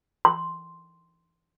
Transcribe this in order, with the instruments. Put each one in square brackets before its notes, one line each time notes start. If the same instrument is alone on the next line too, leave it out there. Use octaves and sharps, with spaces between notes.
[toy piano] C6